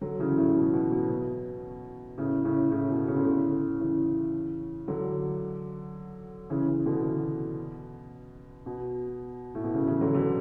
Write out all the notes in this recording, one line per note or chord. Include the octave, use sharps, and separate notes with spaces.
D3 F#3
C#3 E3
A2 C#3
B2
B2
B2
B2
A2 C#3
A2 C#3
A2 C#3
B2
C#3
D3
A2 C#3
C#3 E3
D3 F#3
C#3 E3
C#3 E3
B2 D3
B2
B2
A2
B2
A2 C#3
C#3 E3
D3 F#3
B2 D3